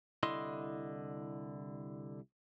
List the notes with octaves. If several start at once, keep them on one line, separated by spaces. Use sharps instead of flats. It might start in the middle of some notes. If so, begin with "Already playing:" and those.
C2 D3 E4 D#5 C6